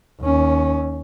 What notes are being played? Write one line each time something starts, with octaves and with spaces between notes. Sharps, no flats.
D#2 C#4